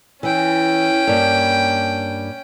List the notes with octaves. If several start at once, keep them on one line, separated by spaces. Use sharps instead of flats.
E3 C#4 G5
G2 A#3